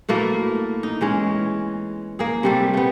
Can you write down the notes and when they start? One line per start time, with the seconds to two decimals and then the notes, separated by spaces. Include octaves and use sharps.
0.09 B2 A3 A#3 E4
0.83 D#4
1.01 E3 G#3 C#4
2.19 A#3 G#4
2.43 C3 G3 A3
2.74 A3 B3